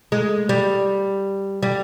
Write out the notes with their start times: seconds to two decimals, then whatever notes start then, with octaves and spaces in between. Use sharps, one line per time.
0.12 G#3
0.49 G3
1.63 G3